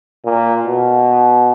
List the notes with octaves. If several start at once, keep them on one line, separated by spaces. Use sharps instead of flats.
A#2
B2